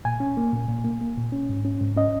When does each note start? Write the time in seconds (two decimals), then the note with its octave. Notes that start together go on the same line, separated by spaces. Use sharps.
0.05 A#2 G#5
0.20 C#4
0.37 A#3
0.53 A#2
0.68 A#2
0.84 A#3
1.01 A#3
1.17 A#2
1.32 C#4
1.49 G#2
1.65 C#4
1.81 G#2
1.97 C#4 D#5